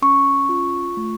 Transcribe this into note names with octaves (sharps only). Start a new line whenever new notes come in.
C#4 C#6
F4
A3